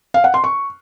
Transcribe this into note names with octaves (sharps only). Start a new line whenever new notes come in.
F5
F#5
C6
C#6